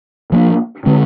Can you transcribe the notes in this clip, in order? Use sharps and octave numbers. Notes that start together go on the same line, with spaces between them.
F3 A#3 D4
D3 G#3 C4